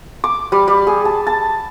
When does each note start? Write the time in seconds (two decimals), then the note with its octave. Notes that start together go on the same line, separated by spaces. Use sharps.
0.24 D6
0.52 G3
0.68 G3
0.87 G#4
1.05 A5
1.27 A5